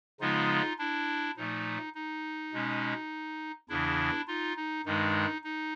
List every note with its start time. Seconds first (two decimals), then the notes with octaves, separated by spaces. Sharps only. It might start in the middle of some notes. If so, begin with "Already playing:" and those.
0.20 C#3 F3 G#3 B3 D#4 F4
0.79 D4 E4
1.37 A#2 F3 A3 D#4
1.95 D#4
2.53 B2 G#3 C#4
3.69 E2 C#3 E3 D4 E4
4.27 D#4 F4
4.57 D#4
4.85 G2 D#3 G#3 D#4
5.44 D#4